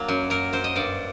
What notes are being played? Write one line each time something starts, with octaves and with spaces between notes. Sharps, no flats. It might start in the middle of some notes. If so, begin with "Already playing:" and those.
Already playing: F#3 A#3 D4
F#2
F#2 A#4
F#2 C5
D#5
G2 D5